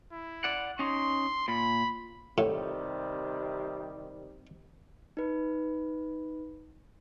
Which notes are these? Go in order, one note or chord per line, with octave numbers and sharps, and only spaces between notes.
E4
D5 F#5
C#4 D#4 C6
A#2 B5
A2 C3 D#3 G3
D#4 B4